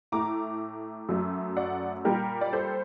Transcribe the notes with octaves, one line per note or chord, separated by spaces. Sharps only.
A2 A3 A#5 D6
F#2 F#3 A3
D5 F#5
A#2 G3 A#3 G4 A#4
D5
A4 C5